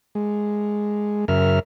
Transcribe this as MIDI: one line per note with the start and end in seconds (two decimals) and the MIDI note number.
0.15 1.25 56
1.28 1.59 42
1.28 1.59 49
1.28 1.59 70
1.28 1.59 76
1.28 1.59 89